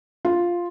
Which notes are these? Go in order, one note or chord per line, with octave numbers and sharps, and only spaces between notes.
F4